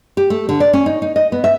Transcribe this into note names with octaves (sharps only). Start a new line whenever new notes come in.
G4
A3
D3
D5
C#4
D#4
D#4
D#5
B3
E5